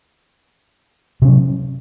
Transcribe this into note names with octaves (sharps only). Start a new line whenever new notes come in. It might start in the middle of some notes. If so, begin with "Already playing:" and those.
C3 F#3 C#4